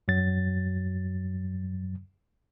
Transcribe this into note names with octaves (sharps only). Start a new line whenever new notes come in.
F#2 F#3 A6